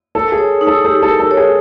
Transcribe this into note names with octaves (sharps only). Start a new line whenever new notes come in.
A4 A#4
G#4
C#5
D#4
A4
G4 A4
A4
A#4
A4
C#5
G#4